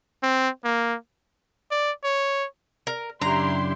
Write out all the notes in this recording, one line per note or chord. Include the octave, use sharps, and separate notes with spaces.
C4
A#3
D5
C#5
A#4
F#2 C#3 D4 E4 G4 A#5 C6